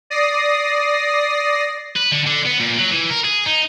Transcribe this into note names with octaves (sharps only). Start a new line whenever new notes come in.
D5 D#6 A#6 C7
B4
D3
D3
B3
A#2
F#3
E3
A#4
G#4
D#4